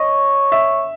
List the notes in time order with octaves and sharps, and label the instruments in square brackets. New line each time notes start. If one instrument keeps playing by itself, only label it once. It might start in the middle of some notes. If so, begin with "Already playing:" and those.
Already playing: [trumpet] C#5 [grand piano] D#5
[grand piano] E5